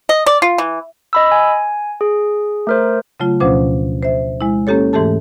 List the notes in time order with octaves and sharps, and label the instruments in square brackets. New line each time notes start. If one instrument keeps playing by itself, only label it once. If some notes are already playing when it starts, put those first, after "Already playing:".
[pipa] D#5
D5
F4
E3
[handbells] D#5 B5 E6
G#5
G#4
A3 A#4 C5
[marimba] C#3 F#3 A3 F4
D2 B2 F3 C#4 C5 D6
C5 E5
G#3 E4
A#3 C#4 G4 A4 C#5
G#2 E3 A3 G4 A4 A5